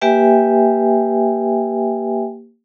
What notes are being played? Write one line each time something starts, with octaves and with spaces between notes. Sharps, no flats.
A#3 G4 B4 E5 G5 G#5